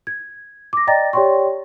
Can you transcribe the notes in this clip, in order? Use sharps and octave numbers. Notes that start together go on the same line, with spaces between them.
G#6
D6 A#6
D5 D#5 G5 A#5 A6 A#6
G4 C#5 D5 G5 C6 C#6